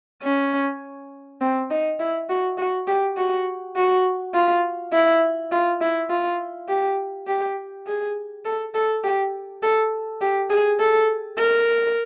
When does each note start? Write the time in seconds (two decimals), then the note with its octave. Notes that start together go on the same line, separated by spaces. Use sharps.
0.23 C#4
1.41 C4
1.70 D#4
2.00 E4
2.29 F#4
2.58 F#4
2.87 G4
3.17 F#4
3.76 F#4
4.34 F4
4.93 E4
5.51 F4
5.81 E4
6.10 F4
6.69 G4
7.27 G4
7.86 G#4
8.45 A4
8.74 A4
9.04 G4
9.63 A4
10.21 G4
10.50 G#4
10.80 A4
11.39 A#4